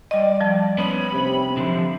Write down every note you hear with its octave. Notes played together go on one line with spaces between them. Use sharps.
G3 D5 D#5
F3 G3 A5
B3 C#4 B5
C3
D3 D#3 F3